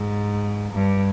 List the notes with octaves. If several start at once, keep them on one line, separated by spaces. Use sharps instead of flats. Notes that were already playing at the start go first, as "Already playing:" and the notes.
Already playing: G#2
G2